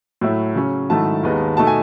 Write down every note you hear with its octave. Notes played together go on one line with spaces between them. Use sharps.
A2 F#3 A3 E4
C#3 F#3 C#4
G#2 D#3 F#3 A3 E4 A5
D#2 D#3 G#3 B3 D#4
B2 A3 D#4 A5
G#5